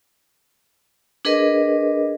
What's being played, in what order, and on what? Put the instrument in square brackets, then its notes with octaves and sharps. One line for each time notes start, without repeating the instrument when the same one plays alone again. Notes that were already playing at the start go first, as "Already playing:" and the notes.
[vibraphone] D4 G#4 A#4 B4 D#5